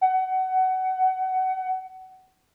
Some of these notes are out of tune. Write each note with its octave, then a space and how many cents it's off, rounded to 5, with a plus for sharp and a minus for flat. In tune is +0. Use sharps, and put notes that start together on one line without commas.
F#5 +20